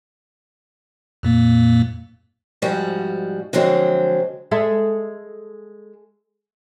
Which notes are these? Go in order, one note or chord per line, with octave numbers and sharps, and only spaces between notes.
F2 A#2 A#3
G#2 F3 G3 F#4
D3 F3 F#3 G#3 C4
G#3 A4 E5